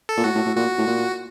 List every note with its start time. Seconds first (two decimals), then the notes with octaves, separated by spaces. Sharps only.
0.09 A4
0.17 A#2
0.24 A2 F#4
0.35 A2
0.46 A2
0.56 A#2 F#4
0.78 A2
0.87 A#2